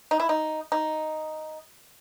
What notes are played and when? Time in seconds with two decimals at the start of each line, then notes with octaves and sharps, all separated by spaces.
0.11 D#4
0.20 E4
0.29 D#4
0.72 D#4